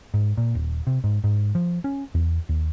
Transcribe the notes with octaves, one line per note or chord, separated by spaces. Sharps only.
G#2
A#2
D#1
C3
G#2
G#2
F3
C#4
E2
D#2